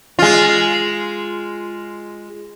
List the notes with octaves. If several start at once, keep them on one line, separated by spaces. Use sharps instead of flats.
G#3 F4